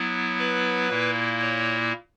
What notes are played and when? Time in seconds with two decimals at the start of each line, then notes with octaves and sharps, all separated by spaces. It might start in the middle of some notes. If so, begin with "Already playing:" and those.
Already playing: F#3 B3 E4
0.39 B4
0.90 A#2 A#3 E4
1.41 C#5